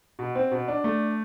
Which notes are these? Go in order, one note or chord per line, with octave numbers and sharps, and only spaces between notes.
B2
C4
B2
D4
A3